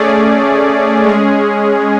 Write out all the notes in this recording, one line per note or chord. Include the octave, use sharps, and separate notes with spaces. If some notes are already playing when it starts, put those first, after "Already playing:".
Already playing: A3 C#4 G#4 D5
G#3 C#4 G#4